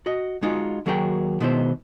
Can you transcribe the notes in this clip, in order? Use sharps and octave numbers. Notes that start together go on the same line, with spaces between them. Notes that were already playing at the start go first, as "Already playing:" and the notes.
F#4 D#5
G#3 D#4 F4 F#4
D#2 F#3 F#4 G#4 A#4 G5
B2 D#3 G#3 B3 E4 C5